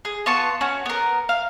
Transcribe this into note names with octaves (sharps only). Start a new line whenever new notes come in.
G#4
B3 F4 A5 C#6
C#4 F#4
B3 A#4
F5